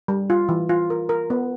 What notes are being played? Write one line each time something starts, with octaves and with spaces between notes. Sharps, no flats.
G3
F4
E3
F4
A#4
A#4
B3